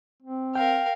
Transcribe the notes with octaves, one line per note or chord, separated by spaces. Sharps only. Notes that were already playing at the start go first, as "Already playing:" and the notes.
C4
A#4 F5 G5